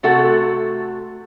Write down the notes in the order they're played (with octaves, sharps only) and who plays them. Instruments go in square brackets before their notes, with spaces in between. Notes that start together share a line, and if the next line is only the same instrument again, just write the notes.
[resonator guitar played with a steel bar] C3 A3 F#4 A4 F#5